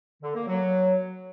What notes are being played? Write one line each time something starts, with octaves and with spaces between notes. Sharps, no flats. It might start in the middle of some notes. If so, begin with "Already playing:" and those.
D3
A#3
F#3